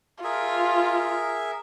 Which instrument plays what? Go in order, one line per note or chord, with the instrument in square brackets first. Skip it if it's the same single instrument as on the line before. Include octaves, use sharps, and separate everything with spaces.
[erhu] F4 [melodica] G#4 A#4 E5